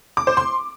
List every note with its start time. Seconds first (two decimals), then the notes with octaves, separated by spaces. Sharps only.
0.17 D6
0.27 C5
0.37 C6